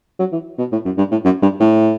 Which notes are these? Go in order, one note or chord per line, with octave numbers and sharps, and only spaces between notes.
F#3
E3
B2
A2
F#2
G2
A2
F#2
G2
A2